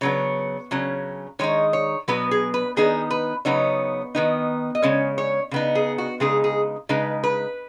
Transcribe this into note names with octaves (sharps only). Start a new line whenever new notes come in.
C#3 F#3 B3 C#5
C#3 F#3 C#4
D#3 G#3 D#4 C#5
C#5
B2 F#3 B3 B4
G#4
B4
D#3 B3 D#4 G#4
B4
C#3 F#3 B3 D#4 C#5
D#3 B3 D#4
D#5
C#3 G#3 C#4 C#5
C#5
C#3 B3 D#4
G#4
F#4
C#3 G#3 D#4 G#4
G#4
C#3 G#3 D#4 B4
B4